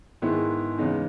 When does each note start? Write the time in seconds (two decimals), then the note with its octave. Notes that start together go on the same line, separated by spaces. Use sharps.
0.22 G#2 D#3 G#3 B3 E4
0.78 E2 C#3 G#3 B3 D#4